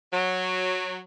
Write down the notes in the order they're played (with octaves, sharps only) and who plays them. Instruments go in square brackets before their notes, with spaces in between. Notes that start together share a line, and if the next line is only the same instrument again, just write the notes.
[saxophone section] F#3